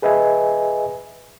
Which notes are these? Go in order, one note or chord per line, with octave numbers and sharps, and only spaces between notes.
G#4 B4 D#5 E5 G#5